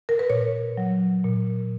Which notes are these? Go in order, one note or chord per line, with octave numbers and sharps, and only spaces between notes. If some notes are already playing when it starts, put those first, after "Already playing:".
A#4
B4
A#2 C#5
F#3
A#2